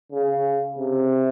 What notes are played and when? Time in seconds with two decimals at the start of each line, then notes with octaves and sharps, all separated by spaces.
0.12 C#3
0.78 C3